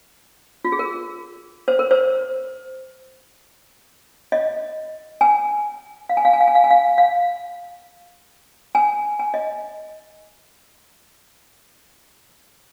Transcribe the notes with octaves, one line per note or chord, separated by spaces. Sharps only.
F4
G#4
A#4
C5
A#4
C5
D#5
G#5
F5
G#5
F5
G#5
F5
G#5
F5
G#5
F5
F5
G#5
G#5
D#5